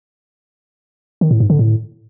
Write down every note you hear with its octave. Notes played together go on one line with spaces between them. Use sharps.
D#3
A2
G#2
D3
A2